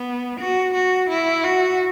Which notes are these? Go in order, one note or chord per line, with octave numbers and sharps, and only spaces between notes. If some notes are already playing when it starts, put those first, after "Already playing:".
Already playing: B3
F#4
F#4
E4
F#4